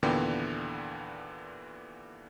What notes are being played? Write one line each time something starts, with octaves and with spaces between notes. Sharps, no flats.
D#2 A#2 D3 E3 B3 G5